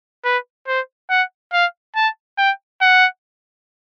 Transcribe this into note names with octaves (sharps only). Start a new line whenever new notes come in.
B4
C5
F#5
F5
A5
G5
F#5